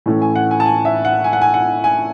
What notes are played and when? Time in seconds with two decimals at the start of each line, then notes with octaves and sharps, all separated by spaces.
0.06 A2 E3 A3 C#4
0.22 G#5
0.35 F#5
0.51 G#5
0.60 A5
0.66 G#5
0.85 E5
1.05 F#5
1.24 G#5
1.33 F#5
1.41 G#5
1.54 F#5
1.84 G#5